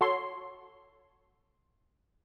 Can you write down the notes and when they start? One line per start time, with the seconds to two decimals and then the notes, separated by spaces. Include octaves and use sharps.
0.01 F#4 A4 C#5 C6